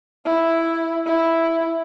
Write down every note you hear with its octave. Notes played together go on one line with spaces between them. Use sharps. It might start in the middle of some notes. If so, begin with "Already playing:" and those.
E4
E4